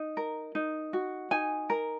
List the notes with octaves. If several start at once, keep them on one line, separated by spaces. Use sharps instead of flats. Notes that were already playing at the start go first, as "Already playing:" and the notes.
Already playing: D#4
A#4
D#4
F#4
D#4 G#5
A#4